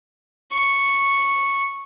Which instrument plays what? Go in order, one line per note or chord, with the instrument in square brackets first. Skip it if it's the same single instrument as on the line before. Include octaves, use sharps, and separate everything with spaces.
[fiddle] C#6